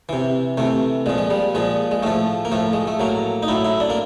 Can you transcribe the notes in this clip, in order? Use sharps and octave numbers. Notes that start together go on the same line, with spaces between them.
C3 E3
C3 E3 A3
A#2 F3 G#3
G#3
G3
A#2 F3 G#3
G#3
A2 F3 A3
A#3
A2 F3 A3
G#3
A3
A2 F#3 A#3
D#4
A2 F#3 E4
E4
D4
A#3